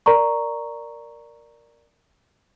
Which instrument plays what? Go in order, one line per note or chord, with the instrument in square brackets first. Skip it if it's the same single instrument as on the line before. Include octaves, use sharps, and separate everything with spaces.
[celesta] A#4 D5 A#5 C#6